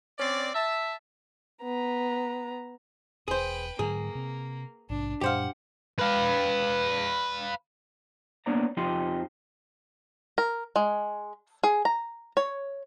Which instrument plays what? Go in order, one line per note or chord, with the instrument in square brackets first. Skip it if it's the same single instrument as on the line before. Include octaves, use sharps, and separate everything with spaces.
[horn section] C4 C#4 D5
E5 A5
[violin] B3 A#5
[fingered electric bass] E1 [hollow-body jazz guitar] G#4 C5 [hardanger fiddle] B4 G5
[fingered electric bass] G#2 D3 F#3 [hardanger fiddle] A#3 [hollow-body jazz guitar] G#4
[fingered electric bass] C3 C4
[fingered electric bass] A#1 G#2 C3 [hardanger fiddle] D4
[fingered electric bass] F#2 A#2 G3 [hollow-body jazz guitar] G4 C5 F5 [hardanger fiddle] F#5
[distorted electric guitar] B4 F5
[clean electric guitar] A#3 B3 D4 C#5 D5 A#5
F2 F3 C4 D#4 G4 C6
[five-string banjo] A#4
G#3
G#4
A#5
C#5